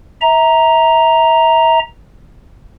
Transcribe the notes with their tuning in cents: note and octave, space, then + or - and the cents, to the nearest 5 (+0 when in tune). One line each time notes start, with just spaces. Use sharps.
E5 -30 A#5 +0